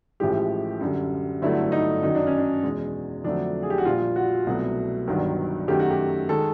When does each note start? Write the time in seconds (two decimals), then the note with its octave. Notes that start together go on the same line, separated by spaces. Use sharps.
0.20 A1 A2 F3 G#3 G4
0.80 F#2 D3 G3
1.42 G1 G2 D3 F#3 A3 E4
1.72 D#4
2.03 F#2 D#3 F#3 D#4
2.15 D4
2.27 C#4
2.38 D4
2.63 E2 B2 G#3
3.24 F2 D3 F#3 A3 D4
3.63 G#4
3.70 G4
3.78 F#4
3.85 A#1 A#2 G3 F4
4.16 F#4
4.47 C2 B2 F#3 A3 F#4
5.07 G1 G2 D#3 F#3
5.68 F#2 D#3 F#3 A3 G4
5.80 F#4
5.91 G4
6.29 D#3 G#3 A4